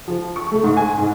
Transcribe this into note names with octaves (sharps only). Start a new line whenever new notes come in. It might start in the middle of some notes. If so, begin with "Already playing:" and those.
F3
C#6
A3
G#2
G#5
G#2